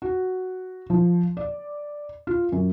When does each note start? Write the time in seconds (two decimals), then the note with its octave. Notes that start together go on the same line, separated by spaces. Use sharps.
0.02 F#4
0.90 F3
1.37 D5
2.27 F4
2.52 F#2